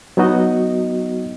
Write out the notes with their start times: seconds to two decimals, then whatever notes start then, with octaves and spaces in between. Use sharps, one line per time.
0.17 F#3 B3 D#4 F#4 D#5